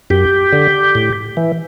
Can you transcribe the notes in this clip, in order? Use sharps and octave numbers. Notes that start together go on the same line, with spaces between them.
F#2 G4
D3
A2
E3